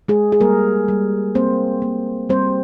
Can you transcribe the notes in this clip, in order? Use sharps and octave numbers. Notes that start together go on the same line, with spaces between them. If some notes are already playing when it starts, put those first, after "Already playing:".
G#3 G#4
G#4
G3 A#3 A#4
G3
A#3 C4 C5
A#3
G3 C4 C5